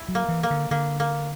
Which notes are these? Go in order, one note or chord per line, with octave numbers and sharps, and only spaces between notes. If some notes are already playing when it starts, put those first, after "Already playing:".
Already playing: E4
F#3
A#3
E3
A#3
D3
D3 A#3
A#3